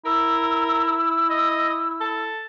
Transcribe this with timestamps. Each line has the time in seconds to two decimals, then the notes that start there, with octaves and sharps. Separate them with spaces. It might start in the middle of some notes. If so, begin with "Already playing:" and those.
0.05 E4 A#4 E6
1.29 D#5
2.00 A4